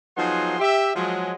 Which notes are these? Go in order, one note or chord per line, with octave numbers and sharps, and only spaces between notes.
F3 F#3 B3 D#4 G#4 C6
G4 E5
F3 F#3 G#3